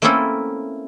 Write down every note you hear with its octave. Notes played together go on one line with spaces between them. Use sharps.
A3 A#3 C4 C#4 E4 A4